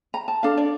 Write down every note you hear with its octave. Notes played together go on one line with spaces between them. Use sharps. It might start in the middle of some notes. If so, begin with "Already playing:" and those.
A#5
A5
D4 A4 F5
D5